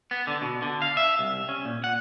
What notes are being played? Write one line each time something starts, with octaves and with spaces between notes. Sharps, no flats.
B3
D3
B2
D3
F5
E5
C2
C#4
A#2
F#5